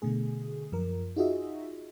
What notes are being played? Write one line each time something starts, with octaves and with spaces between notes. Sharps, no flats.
B2 D3 A3 G#4
F#2 F3 A#4
D#4 F4 F#4 G#4 D#5 E5